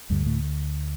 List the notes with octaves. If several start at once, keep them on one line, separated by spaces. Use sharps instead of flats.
D2 G2 D3 G3
A2 A3